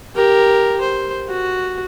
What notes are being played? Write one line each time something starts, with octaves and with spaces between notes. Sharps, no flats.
G4 A#4
C5
F#4